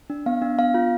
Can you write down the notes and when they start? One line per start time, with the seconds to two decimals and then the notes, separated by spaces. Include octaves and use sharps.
0.10 D4
0.26 B3 F5
0.42 D4
0.59 B3 F5
0.74 F4